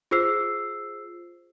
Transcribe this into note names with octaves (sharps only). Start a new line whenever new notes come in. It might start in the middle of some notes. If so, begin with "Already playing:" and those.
F4 G#4 C5 E6 C7